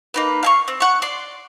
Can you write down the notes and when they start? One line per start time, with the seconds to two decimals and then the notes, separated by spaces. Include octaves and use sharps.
0.14 A#3 D#4 B4
0.43 F5 G#5 C#6
0.68 C4
0.80 F#5 C#6
1.02 D5 C6